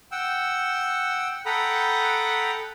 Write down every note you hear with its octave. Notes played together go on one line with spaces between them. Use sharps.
F#5 G5 E6
A4 F#5 G5 A#5 B5 D#6